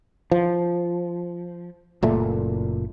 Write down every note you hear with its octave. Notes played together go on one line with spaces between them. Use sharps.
F3
F#1 A#2 A3